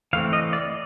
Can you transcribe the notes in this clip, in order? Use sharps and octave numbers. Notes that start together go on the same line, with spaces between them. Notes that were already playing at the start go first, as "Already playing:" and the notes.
E3 A3 C4 F5
D#5
D5